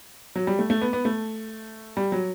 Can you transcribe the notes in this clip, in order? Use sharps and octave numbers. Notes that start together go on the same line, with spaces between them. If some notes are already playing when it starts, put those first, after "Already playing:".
F#3
G3
A3
A3
B3
B3
A3
G3
F#3